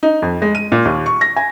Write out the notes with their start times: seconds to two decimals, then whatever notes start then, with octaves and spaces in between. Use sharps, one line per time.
0.03 D#4
0.22 F2
0.42 G#3
0.55 D#7
0.72 A#2
0.85 D#2
1.06 C#6
1.21 A#6
1.36 G#5